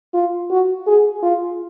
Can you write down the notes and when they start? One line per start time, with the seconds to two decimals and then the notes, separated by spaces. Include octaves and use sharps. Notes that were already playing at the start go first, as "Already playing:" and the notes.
0.14 F4
0.51 F#4
0.87 G#4
1.23 F4